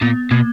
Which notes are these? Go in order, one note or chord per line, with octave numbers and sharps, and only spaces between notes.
A#2 B3
B2 A#3